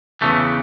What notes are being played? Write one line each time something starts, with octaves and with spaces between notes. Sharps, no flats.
E2 C#3 E3 A3